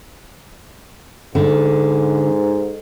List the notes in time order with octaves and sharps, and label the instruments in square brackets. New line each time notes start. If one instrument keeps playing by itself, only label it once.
[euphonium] G#2 [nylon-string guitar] D3